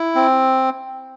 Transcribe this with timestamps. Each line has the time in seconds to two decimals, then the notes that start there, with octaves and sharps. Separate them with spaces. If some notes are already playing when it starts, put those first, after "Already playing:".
Already playing: E4
0.15 C4